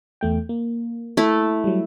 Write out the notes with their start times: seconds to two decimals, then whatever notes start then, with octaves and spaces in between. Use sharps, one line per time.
0.21 E2 A3 G5
0.49 A#3
1.17 A3 E4
1.64 F#3 G3